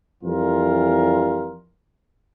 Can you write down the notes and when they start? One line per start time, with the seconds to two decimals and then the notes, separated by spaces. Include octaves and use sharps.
0.23 F2 E3 G3 F4 A#4